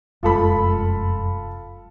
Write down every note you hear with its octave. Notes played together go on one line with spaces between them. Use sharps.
F1 F#2 G#3 F4 A4 B5